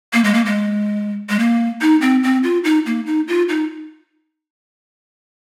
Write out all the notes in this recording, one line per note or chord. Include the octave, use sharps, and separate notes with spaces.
A#3
G#3
A#3
G#3
G#3
A#3
D#4
C4
C4
F4
D#4
A#3
D#4
F4
D#4